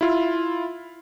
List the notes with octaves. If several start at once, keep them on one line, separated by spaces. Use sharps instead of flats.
E4 F4